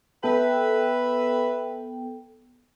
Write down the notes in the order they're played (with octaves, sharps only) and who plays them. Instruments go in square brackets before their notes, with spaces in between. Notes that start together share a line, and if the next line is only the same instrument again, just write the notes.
[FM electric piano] B3 A4 G5 [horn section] B4 E5